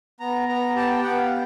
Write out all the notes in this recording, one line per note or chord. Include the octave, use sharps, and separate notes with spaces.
B3 A#5
B3 A#5
G4 A5
G5
B3 F#5
F5